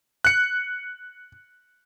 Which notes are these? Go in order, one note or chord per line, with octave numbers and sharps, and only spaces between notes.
F#6 C#7